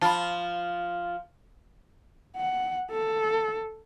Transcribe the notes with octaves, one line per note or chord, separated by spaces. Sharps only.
F3 F4 A5 B5
F#5
A4